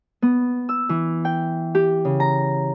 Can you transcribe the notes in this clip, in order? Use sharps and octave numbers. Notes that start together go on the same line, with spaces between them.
B3
E6
E3
G5
G4
C#3
A#5